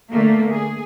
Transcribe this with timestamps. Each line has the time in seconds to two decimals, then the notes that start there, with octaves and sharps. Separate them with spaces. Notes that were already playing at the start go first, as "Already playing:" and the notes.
0.11 D3 A3 A#3
0.50 G#4